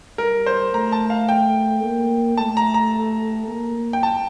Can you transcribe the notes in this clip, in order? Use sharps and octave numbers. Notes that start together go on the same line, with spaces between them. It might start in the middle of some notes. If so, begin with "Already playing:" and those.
G3 A#4
C5
A3 A#5
A5
F5
G5
A#3
A3 A5
A#5
A#5
A#3
G5
A5